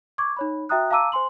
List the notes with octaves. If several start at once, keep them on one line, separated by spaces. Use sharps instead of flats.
C#6 D6 G#6
D#4 C#5 B5
F#4 E5 G5 A#5 D#6 F#6
F5 A5 A#5 D6 E6 D#7
C5 G#5 C6 F#7